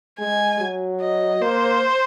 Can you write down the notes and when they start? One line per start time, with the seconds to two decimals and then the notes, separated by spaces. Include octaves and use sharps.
0.20 G#3 G#5
0.60 F#3
1.01 D#5
1.41 A#3 C5